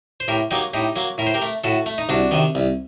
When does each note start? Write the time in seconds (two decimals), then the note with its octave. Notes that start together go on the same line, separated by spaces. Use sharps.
0.20 C5
0.28 A2 G4 A#4
0.51 F#3 A#3 D#4 G4
0.74 A2 D#4 G4
0.96 F#3 A#3
1.18 A2 A#4
1.26 C5
1.34 G4 A#4
1.42 A3
1.64 A2 F#4 A4
1.86 A3
1.98 D#4
2.09 C2 D4 F#4
2.31 C3 D#3
2.55 C2